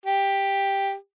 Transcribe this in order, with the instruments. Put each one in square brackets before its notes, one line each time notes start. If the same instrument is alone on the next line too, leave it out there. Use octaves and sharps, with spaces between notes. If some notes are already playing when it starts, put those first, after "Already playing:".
[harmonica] G4